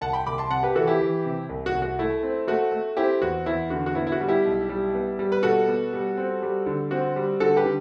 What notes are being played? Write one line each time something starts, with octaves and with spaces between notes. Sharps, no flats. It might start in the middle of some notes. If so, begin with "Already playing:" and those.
C2 F#5 A5
G5 B5
C2 B5 D6
A5 C6
C3 F#5 A5
G4 B4
E3 F#4 A4
E4 G4
E3
C3
C2
F#4
C2
F#4
A3 E4
C4
A3 F#4
A3
C4 E4 G4
E2 F#4
E2 E4
D3 F#4
F#4
B3 E4
E4
F#4
G3
E4 G4
B1
G3
B3
G3
B4
B2 F#4 A4
B3
G3
C4
G3
D3
C4 F#4
G3
D3 F#4 A4
G4 B4
D3